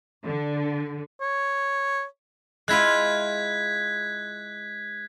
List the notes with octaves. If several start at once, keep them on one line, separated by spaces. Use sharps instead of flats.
D3
C#5
G#3 E4 F4 F#6 G#6 B6